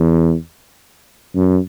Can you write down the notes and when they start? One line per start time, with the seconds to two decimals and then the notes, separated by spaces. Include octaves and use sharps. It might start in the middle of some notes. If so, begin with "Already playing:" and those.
Already playing: E2
1.36 F#2